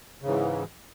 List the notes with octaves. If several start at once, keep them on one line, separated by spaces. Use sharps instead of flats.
G#2 C#3 E3